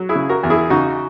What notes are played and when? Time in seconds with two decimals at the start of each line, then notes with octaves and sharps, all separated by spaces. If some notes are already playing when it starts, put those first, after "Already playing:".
Already playing: F#3
0.09 E4 G#4
0.15 C#3
0.29 F#4 A#4
0.43 E2
0.50 E4 G#4
0.70 C#3 D#4 F#4